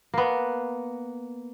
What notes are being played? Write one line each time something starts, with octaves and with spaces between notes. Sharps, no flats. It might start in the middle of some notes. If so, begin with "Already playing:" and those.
A#3 B3